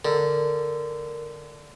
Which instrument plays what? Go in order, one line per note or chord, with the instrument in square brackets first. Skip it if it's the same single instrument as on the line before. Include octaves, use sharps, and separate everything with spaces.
[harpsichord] D3 [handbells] A#4